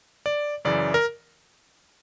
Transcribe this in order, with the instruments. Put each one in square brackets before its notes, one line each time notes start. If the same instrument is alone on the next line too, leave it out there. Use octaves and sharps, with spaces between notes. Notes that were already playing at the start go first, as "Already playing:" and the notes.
[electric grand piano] D5
F#2 C#3 E3 D5
A#4